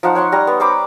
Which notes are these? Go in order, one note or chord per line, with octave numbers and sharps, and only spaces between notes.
F3 D#4 F#5
C#5 F#5 C6 C#6
G3 A#5
B3
C5 A#5 B5 D6